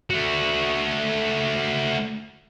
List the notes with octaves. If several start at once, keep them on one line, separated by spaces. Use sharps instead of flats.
A3 F#4